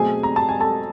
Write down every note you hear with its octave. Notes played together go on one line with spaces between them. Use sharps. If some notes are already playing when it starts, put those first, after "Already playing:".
Already playing: B2 F#3 A3 C4 G#4 G#5
A#5
A5
G#5
A4 A5